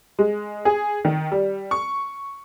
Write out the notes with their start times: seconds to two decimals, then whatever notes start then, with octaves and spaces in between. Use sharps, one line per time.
0.19 G#3
0.65 G#4
1.05 D#3
1.32 G3
1.71 C#6